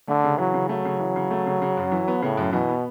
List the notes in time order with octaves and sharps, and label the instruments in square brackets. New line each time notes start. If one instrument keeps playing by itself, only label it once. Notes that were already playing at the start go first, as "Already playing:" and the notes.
[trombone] D3 [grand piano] A3
[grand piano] C#3
[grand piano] E3 [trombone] F#3
[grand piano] C#3
[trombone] F#3 [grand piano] A3
[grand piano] C#3
E3
C#3
A3
C#3
C#3
F#2
E3
B3
[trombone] A2 [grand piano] C#3
[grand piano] F#2
[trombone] B2 [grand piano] E3
[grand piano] B3